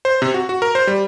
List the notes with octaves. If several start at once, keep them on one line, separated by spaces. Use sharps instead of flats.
C5
C3
F#4
F#4
A#4
C5
G3